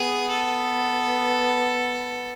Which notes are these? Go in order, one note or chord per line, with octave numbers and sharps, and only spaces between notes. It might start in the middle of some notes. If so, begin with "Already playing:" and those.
Already playing: B3 G#4
A4